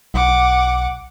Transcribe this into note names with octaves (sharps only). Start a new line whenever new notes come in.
B1 F#5 D6